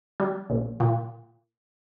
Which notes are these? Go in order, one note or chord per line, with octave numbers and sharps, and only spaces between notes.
G3
A#1
A#2